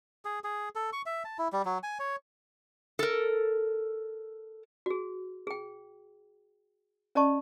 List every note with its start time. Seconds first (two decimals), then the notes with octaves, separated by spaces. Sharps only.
0.25 G#4
0.44 G#4
0.75 A4
0.93 C#6
1.06 E5
1.25 A5
1.39 E4
1.53 G3
1.65 F#3
1.83 G#5
2.00 C#5
2.99 A4 A#4
4.86 F#4 G#4
5.47 G#4 G5
7.15 C#4 D5 D#5 A5 C#6